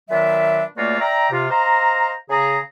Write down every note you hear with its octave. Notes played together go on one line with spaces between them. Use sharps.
A#2 D#3 F#3 D4 B4 E5
C#2 A3 A#3 F4 F#4 D5
D5 E5 G5 A#5
C3 F4
C5 D#5 F5 A#5
C#3 G#4 A#5